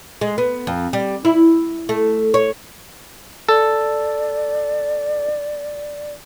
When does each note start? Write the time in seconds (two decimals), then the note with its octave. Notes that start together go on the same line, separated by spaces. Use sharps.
0.21 G#3
0.38 B3
0.67 F2
0.93 G3
1.25 E4
1.89 A3
2.34 C#5
3.49 A4 D5